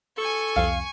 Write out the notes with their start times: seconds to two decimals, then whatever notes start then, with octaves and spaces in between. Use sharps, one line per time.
0.18 A4 G#5 C#6
0.56 C2 F2 F5